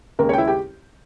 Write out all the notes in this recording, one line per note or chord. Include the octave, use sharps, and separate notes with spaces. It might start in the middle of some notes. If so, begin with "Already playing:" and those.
D#2 C#3 G#3 A#3 A#4
C#4 C#5 G5
E4 E5
G4 G5